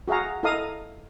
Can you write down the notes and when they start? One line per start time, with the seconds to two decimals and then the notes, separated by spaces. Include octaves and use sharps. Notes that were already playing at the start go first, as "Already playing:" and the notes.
0.08 F#4 G#4 E5 F5 A#5
0.43 E4 A4 D#5 F5 A#5 D#6